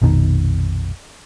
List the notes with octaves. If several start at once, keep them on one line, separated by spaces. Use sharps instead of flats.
A#1 F2 B2 D#3